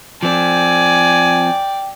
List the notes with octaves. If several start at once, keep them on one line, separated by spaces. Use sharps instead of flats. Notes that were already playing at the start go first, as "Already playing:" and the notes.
F3 C4 D5 G5 G#5